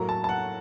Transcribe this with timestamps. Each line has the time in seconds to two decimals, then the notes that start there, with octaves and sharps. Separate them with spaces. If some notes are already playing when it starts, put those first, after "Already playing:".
Already playing: A2 F#3 A#3 A#5
0.09 A5
0.24 A5
0.29 F#5